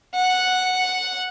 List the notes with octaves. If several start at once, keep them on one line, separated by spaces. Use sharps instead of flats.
F#5